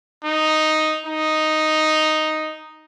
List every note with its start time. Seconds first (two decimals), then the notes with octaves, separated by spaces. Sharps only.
0.24 D#4
1.06 D#4